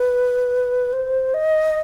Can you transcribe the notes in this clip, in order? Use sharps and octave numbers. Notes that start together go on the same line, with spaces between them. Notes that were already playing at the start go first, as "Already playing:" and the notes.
Already playing: B4
C5
D#5